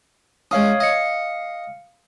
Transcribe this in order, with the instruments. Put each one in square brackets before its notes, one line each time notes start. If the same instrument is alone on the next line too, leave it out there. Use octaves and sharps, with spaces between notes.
[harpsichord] G#3 C#4 [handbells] C#5 F5 D#6
[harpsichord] D#5 [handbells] F5 C#7